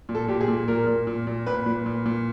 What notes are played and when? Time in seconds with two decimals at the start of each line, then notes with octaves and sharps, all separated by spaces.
0.09 A#2
0.15 A4
0.28 A#2 G4
0.41 G#4
0.48 A#2
0.68 A#2 A#4
0.87 A#2
1.07 A#2
1.27 A#2
1.46 A#2 B4
1.66 A#2
1.86 A#2
2.06 A#2